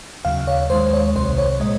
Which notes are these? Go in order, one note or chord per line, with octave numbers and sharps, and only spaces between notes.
D#2 C#3 F#3 F5
C#5
D#2 D#3 G#3 C5
C#5
C2 C3 F#3 C5
C#5
A#2 G#3 D#5